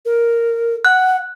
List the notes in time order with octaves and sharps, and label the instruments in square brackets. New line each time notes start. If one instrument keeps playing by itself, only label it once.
[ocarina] A#4
[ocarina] F#5 [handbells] F#6